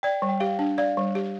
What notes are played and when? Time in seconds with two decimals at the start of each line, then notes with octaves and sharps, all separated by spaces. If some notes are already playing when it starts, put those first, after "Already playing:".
0.03 D5 G5
0.22 G3
0.29 G5
0.40 G4 F5
0.59 D4
0.78 D5 F5
0.97 G3
1.15 G4